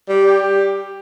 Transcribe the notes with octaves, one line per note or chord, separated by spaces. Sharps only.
G3
G4